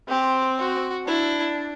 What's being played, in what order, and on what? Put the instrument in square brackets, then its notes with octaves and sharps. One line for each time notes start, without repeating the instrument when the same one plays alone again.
[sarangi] C4 [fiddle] G4
[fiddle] F#4
[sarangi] D4 [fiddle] E4